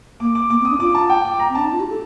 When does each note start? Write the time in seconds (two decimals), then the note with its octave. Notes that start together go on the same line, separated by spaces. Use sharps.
0.20 A#3 D6
0.35 D6
0.50 A#3 D6
0.61 C4
0.65 D#6
0.70 D4
0.80 F4 D6
0.95 A5
1.10 G5
1.25 D6
1.40 A#5
1.50 C4
1.55 D4 A5
1.65 D#4
1.73 F4
1.80 G4
1.90 A4